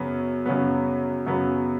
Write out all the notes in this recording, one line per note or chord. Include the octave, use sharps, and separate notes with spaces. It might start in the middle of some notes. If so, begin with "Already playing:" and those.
Already playing: F#2 C#3 F#3 B3
F#2 C#3 F#3 B3
F#2 C#3 F#3 B3